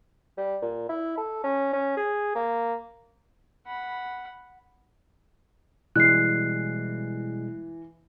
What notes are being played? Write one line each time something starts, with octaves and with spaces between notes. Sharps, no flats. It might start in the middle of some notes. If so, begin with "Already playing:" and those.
G3
A#2
E4
A4
C#4
C#4
G#4
A#3
F#5 B5
B2 E3 G3 G#3 F#6 C7